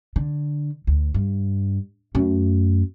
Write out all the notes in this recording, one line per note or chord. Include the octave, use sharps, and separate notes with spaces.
D3
D2
G2
F#2 A3